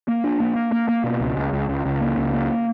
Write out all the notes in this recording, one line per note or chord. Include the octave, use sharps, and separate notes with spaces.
A#3
D4
A#3
A#3
A#3
A#3
B2
C#2
C#2
C#2
C#2
C#2
A#3
C#2
A#3